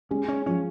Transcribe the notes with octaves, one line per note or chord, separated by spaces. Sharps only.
G#3 C#4
C#4
F3 C#4